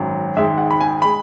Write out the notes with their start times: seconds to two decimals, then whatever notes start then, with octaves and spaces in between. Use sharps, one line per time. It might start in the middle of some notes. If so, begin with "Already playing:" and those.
Already playing: G#1 F#2 F#3
0.36 G#1 G#2 G#3 E5
0.58 F#5
0.71 B5
0.81 G#5
1.02 G#3 B5